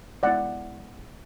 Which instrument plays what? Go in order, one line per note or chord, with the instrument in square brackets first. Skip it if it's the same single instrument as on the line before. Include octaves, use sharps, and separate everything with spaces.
[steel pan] G#3 B3 E4 D5 F#5